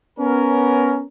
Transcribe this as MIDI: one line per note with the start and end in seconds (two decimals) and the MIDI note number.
0.19 1.04 59
0.19 1.04 61
0.19 1.04 70